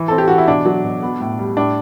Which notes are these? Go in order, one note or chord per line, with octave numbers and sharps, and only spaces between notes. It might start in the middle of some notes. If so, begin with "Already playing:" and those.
Already playing: E3
C4 A4
G4
E3 F#4
E4
B2 D4
F#3
B2
B3
A2
G3
A2 D4